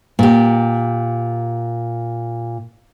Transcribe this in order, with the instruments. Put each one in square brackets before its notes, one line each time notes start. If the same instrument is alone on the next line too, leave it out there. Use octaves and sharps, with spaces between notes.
[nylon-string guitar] A#2 G4